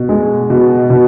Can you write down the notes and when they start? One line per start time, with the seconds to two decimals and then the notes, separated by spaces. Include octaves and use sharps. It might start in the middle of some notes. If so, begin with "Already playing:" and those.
Already playing: B2
0.09 G#3
0.50 B2
0.90 B2